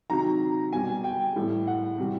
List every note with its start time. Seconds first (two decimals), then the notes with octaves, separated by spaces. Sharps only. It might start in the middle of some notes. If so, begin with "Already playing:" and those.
0.10 C3 D#3 F#3 A#5
0.73 B2 G3 G#5
1.04 G5
1.36 A2 E3 G3
1.67 F#5
1.98 C3 E3 G3